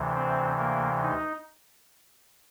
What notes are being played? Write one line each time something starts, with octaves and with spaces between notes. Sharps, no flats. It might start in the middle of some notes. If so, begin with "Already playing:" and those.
Already playing: D2 C3 E3
C4
A#3
D#4